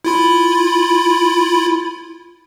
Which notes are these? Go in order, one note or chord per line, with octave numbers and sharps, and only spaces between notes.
E4 F4 B5